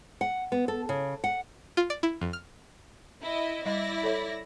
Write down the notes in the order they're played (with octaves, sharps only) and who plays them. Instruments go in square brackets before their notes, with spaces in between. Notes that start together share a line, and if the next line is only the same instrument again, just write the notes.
[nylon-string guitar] F#5
B3
A4
C#3
F#5
[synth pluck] F4
D5
E4
F2
F6
[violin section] E4 D#5
[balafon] G3 D#5 B5 [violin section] E4 D5 A#6
[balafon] A4 C#5 E5